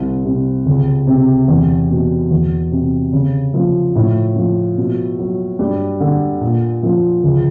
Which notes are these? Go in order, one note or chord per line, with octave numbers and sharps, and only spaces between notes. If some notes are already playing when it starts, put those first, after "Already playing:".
Already playing: C2
C3
C#2
C3
E2
B2
E2
C3
C#3
F3
A2
F3
B2
F#3
G2
D3
A#2
F3
C#2